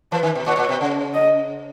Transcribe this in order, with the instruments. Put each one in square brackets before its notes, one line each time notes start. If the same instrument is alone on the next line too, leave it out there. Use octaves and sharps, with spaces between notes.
[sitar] E3 [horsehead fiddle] B4
[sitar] D#3
B2
[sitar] A#2 [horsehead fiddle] C#5
[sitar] A#2
B2
C#3
[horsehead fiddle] D#5